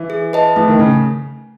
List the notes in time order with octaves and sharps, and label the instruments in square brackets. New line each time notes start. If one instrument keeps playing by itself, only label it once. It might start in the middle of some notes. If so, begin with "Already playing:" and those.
Already playing: [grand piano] E3
[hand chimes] G#4
B4 D#5 A5
[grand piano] E3 [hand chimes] A3
[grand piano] D#3
C#3